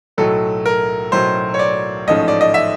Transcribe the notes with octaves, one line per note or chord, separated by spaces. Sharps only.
B1 A2 F#3 A3 A4
A#4
B1 A2 F#3 A3 C5
C#5
D5
A1 G#2 F3 A3 C#4 D#5
D5
D#5
E5